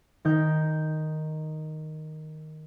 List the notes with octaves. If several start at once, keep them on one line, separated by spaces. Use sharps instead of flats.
D#3 D#4 G5 G6